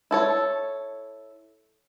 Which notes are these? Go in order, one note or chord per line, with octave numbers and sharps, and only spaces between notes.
E4 A4 C#5